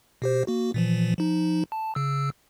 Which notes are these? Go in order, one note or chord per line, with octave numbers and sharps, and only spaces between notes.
B2 G4 C5
A#3 F#4
A#2 E3 F3
F3 D#4
A5
C#3 E6